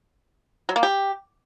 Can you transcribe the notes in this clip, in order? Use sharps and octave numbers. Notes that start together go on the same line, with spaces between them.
F#3
A#3
G4